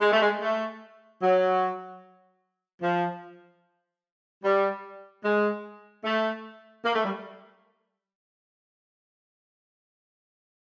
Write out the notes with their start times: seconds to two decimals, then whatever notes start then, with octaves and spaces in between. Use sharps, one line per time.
0.01 G#3
0.12 A3
0.22 G#3
0.41 A3
1.22 F#3
2.82 F3
4.44 G3
5.24 G#3
6.05 A3
6.85 A#3
6.95 A3
7.05 G3